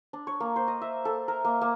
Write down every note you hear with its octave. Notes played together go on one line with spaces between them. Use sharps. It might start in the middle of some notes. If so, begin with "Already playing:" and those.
D4
C#5
A#3
C5
D#5
E5
A4
A#4
A#3
A#3